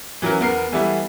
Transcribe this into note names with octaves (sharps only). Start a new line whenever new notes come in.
E3 F#3 C#4 A#4
E2 B3 A#4 C7
E3 G3 A3 B3 E4